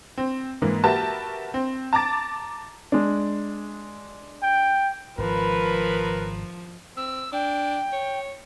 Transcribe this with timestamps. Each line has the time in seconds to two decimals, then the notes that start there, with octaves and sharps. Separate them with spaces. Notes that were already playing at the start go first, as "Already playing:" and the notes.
0.18 C4
0.62 G#2 E3 A#3
0.84 F#4 G4 A#4 B4 E5 A5
1.54 C4
1.93 A5 A#5 D6 A6
2.92 G#3 D4
4.43 G5
5.18 G#1 G#2 C#3 F3 A#4 B4
6.97 C4 E6
7.33 D4 G5
7.92 C#5